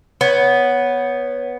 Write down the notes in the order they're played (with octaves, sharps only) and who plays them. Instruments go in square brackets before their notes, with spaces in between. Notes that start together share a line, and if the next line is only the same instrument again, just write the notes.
[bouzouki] B3 [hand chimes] C#5 G#6